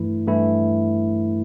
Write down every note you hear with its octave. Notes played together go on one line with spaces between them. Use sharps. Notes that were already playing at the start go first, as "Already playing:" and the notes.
Already playing: G2 E3 A3 E4
G2 E3 A3 E4